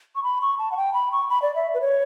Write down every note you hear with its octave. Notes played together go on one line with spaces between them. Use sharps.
C#6
B5
C#6
A5
F#5
G5
B5
C#6
B5
D5
E5
B4
C#5